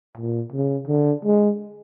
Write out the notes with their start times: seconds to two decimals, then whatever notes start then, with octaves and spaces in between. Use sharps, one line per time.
0.17 A#2
0.53 C#3
0.88 D3
1.25 G#3